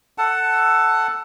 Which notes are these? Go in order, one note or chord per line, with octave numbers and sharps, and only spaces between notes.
A4 F#5 A5